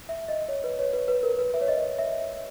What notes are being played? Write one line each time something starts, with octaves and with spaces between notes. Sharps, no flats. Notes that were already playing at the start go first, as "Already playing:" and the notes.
E5
D#5
C#5
B4
C#5
B4
B4
A#4
B4
E5
C#5
D#5
E5